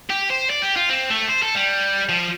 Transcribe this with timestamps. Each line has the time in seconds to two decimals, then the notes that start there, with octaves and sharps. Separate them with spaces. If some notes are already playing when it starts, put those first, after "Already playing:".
0.10 G4
0.30 C5
0.50 D5
0.63 G4
0.76 F4
0.90 C4
1.10 A3
1.29 C5
1.43 A4
1.55 G3
2.09 F3